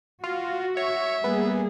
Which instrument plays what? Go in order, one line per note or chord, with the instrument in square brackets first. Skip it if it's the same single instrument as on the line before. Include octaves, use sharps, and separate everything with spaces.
[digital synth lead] F4 [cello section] F#4
[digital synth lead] C#5 [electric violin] E5
[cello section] G3 A#3 G#4 [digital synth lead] B3